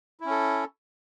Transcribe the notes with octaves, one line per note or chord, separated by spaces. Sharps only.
C#4 E4 A4